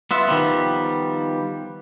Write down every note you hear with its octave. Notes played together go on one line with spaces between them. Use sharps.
B3 F4 E5
D#3 F3 G3 B3